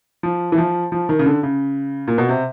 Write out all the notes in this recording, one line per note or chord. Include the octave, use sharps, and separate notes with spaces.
F3
E3
F3
F3
D#3
C#3
D3
C#3
A#2
B2
C3